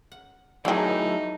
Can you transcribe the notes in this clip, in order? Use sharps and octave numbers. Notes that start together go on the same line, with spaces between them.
F#5
D3 D#3 F#3 A3 D#4 E4 G#4